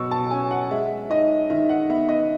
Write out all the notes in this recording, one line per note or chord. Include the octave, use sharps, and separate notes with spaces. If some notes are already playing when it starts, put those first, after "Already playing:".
Already playing: B2 F#3 C#6 E6
A5
C#4 G#5
F#5
G#3 E5
D#4 D#5
D#3 E5
F#5
B3 E5
D#5